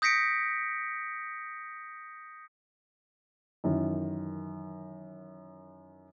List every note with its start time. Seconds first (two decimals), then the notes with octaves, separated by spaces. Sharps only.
0.02 D#6 G6 A#6 B6 C#7 D7
3.64 F#2 D#3 E3